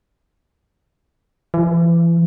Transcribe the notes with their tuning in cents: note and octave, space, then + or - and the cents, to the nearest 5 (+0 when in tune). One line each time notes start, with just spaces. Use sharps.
E3 +35